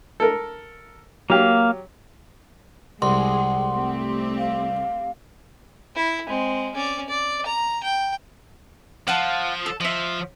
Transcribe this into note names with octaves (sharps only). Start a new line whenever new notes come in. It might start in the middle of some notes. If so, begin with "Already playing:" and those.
A4 A#4
F#3 A#3 G4 F5
C2 G#3 G#4 F#5 C6
A3 C4 G4
F5
E4
G#3 C4
C#4 D5
D5
A#5
G5
F3 F5 F#5 A5
A4
F3 D#5 E5